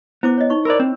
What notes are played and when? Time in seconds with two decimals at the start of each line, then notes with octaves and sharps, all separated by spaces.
0.23 B3 E4 C5 D6
0.38 C#5 D#5
0.50 D#4 C#6
0.65 A#4 C5 D5 B5 E6
0.80 C4